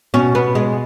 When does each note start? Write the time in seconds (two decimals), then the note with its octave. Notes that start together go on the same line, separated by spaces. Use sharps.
0.14 B2 C#4
0.35 B3
0.55 G#3